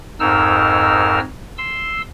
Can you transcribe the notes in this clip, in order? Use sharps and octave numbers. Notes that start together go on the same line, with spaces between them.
F2 G#2 D#4 A#4 E6 F6
C6 E6